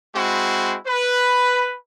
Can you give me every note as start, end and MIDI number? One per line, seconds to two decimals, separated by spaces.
0.15 0.77 56
0.15 0.77 60
0.15 0.77 64
0.15 0.77 66
0.86 1.75 71